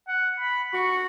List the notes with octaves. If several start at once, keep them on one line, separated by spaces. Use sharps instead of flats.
F#5
B5
F#4 C#6